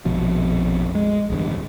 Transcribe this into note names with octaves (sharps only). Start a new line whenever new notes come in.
A#1 F2 B2 F3
G#3
D1 E2 G2